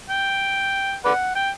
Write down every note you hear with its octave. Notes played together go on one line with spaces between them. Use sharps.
G5
B4 D5 F#5
G5